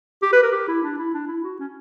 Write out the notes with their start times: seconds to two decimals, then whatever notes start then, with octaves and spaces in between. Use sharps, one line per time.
0.22 G4
0.33 B4
0.43 A#4
0.52 G4
0.68 E4
0.83 D4
0.98 E4
1.14 D4
1.28 E4
1.44 F#4
1.60 C#4